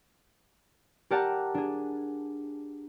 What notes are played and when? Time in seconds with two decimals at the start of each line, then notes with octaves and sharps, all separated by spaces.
1.10 G4 A#4 D5 F#5 A5 A#5
1.55 D4 G#4